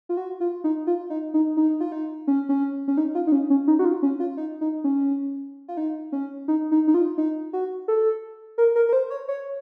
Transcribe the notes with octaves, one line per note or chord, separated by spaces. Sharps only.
F4
F#4
F4
D#4
F4
D#4
D#4
D#4
F4
D#4
C#4
C#4
C#4
D#4
F4
D#4
C#4
C#4
D#4
F#4
F4
C#4
F4
D#4
D#4
C#4
F4
D#4
C#4
D#4
D#4
D#4
F4
D#4
F#4
A4
A#4
A#4
A#4
C5
C#5
C#5